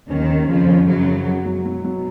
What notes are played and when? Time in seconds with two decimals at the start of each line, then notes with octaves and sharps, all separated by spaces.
0.10 D#2 D#3 C#4
0.30 C#4
0.49 F2 C#3 F3
0.68 C#4
0.88 F#2 C#3 F#3
1.07 C#3
1.26 F#4
1.46 F#3
1.65 B2 F#3
1.84 F#3